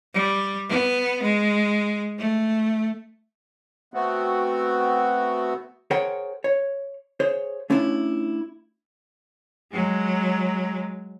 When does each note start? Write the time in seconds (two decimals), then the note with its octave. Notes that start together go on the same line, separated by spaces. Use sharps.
0.14 G3
0.69 B3
1.23 G#3
2.18 A3
3.94 A3 B3 C4 F#4
5.91 G#4 A#4 C5 C#5 F#5 G5
6.44 C#5
7.20 G#4 C5 C#5
7.70 A3 C#4 D4 E4 F4
9.72 F#3 G#3